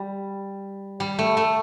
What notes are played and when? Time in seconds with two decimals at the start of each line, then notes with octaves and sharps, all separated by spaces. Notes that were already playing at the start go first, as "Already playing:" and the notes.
Already playing: G3
1.00 G3
1.19 A3
1.37 A3